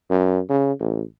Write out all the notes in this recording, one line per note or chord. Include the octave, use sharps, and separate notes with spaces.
F#2
C#3
A1